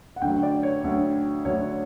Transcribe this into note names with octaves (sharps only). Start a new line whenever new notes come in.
F#5
D2 D3 F#3 G5
D5
C#5
D2 D3 F#3
D2 D3 F#3 C#5